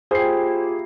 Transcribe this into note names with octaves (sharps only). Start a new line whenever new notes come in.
A#3 E4 F4 G4 G#4 C5 C7